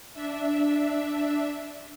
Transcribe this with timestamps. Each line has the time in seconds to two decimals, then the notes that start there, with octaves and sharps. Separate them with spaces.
0.14 D4 E5